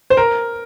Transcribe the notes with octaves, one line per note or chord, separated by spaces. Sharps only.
C5
A#4